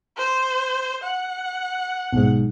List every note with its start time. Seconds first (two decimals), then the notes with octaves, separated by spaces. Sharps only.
0.18 C5
1.04 F#5
2.13 B1 G#2